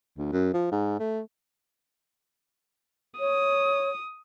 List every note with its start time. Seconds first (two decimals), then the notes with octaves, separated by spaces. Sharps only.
0.18 D2
0.32 F#2
0.54 F3
0.72 G#2
1.00 A3
3.20 C#5 D#6